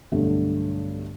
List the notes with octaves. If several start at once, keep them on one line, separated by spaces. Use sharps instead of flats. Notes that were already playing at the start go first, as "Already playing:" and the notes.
B1 G2 D3 A3